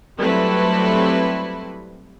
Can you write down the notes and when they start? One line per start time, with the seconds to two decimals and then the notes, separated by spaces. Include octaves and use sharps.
0.19 F#3 G3 A3 C4 E4 B4